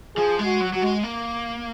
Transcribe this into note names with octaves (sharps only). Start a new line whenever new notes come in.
F3 G#4
G#3
F#4
F#3
F#3 F#4
G#3
A#3